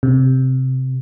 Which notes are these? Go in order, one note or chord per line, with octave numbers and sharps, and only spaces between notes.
C3